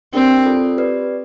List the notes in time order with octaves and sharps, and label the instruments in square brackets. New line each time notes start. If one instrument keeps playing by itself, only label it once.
[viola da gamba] C4 [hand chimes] D4 G4 A#4 D5 G5
[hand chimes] F4 A4 D5
G4 B4 D5